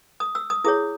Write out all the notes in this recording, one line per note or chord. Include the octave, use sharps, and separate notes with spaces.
D#6
E6
D#6
E4 G#4 C#5 D#6